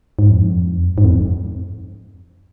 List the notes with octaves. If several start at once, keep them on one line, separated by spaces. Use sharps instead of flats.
G#2
F2
G#2
F2